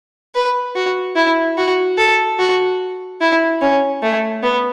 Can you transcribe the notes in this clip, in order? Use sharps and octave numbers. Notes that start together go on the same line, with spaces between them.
B4
F#4
E4
F#4
A4
F#4
E4
C#4
A3
B3